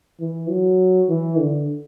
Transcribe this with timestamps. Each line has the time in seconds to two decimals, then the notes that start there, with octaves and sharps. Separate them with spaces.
0.21 E3
0.49 F#3
1.09 E3
1.39 D3